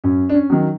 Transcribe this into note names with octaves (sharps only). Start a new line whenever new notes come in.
F#2 C#4
D4
C#4
D#3 F#3